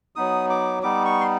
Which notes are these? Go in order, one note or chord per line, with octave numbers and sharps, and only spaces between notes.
F#3 B3 D#4 D#6
D6
G3 B3 D#4 D6
C#6
C6